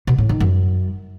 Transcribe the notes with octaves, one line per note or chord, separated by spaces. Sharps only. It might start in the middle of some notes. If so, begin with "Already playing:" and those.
B2
A2
D#3
F#2